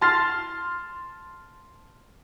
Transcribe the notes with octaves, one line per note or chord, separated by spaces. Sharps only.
A5 C6 F6 A6 C7